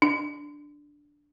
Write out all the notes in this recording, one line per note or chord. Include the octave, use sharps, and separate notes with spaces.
D4